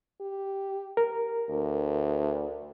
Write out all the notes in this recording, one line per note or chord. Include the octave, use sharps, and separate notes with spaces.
G4
A#4
D2